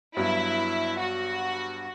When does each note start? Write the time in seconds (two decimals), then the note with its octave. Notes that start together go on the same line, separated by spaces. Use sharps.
0.16 G2 F#3 B3 E4
0.99 F#4